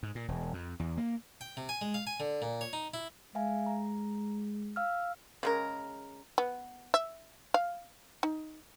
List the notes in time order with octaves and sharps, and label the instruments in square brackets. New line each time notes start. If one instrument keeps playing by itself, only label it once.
[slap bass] G#2
A#2
E1
F2
E2
A#3
[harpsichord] G5
C3
G#5
G#3
F5
G#5
D3
A#2
C#5
D#4
E4
[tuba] G#3 [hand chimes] E5 F5 G#5
[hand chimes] A#5
F5 E6 F6
[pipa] C#3 G#3 A#4
[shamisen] B3
E5
F5
D#4